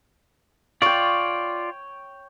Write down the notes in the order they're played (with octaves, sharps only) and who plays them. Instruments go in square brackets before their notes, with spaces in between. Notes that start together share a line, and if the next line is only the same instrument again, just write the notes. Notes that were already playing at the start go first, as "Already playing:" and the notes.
[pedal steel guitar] F4 D5 [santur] C#5 G5